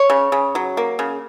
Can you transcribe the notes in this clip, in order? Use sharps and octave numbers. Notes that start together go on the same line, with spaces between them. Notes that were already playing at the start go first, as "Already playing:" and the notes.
Already playing: C#5
C#3
C#3
F#3
A#3
C#3